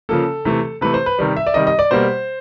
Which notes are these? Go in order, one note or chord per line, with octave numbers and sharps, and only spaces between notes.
C#3 F3 A#3 A4
C3 E3 A3
C3 E3 A3 B4
C5
B4
C3 D#3 G3
E5
D5
C3 D#3 G3 D#5
D#5
D5
B2 G3 A#3 C5